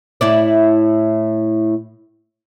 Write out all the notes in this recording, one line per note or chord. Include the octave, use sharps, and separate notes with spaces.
A2 E4 D5